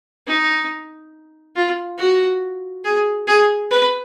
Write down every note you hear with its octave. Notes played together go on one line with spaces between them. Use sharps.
D#4
F4
F#4
G#4
G#4
B4